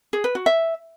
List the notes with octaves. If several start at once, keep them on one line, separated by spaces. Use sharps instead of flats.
G#4
B4
F#4
E5